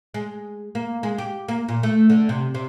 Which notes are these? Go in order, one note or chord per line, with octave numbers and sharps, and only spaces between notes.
G#3
A#3
G#3
G4
A#3
A#2
A3
D3
C3
C3